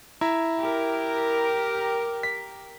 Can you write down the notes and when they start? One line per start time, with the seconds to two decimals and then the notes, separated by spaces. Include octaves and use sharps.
0.21 E4 E5 A#5
0.60 G4 A#4
2.23 B6